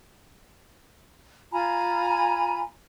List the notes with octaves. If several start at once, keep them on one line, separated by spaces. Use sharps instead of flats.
F4 G#5 A#5 B5